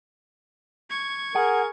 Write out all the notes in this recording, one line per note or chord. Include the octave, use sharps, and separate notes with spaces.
C#6 G#6
G#4 A#4 F#5